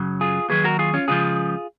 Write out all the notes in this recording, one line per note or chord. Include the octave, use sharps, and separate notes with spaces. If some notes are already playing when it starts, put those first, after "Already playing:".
Already playing: F#2 C#3 F#3
F4 G#4
D#2 D#3 F#3 G#4 B4
F#4 A#4
F4 G#4
C#4 F4
C#2 C#3 F3 F4 G#4